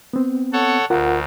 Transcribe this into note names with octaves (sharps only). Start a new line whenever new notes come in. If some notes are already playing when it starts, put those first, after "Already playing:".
B3 C4
A4 C#5 F#5
D2 F4 A#4 F#5